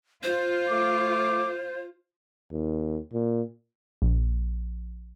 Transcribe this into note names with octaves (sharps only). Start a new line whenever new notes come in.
F4 C5
A3 D6
D#2
A#2
A#1